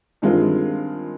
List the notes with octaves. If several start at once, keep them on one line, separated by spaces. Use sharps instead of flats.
G2 D#3 G#3 C4 F4